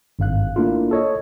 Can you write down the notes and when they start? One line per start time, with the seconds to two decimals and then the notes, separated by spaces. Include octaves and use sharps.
0.19 G#1 G2 F5 F#6
0.56 A3 A#3 D4 E4 F4
0.91 A4 C#5 D#5